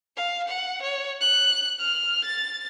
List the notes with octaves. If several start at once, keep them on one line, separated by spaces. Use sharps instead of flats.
F5
F#5
C#5
F#6
F6
A6